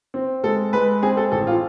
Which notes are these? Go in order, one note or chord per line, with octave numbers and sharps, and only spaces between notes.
C4
G#3 A4
G#3 B4
C4 G#4
A4
A1 A4
F4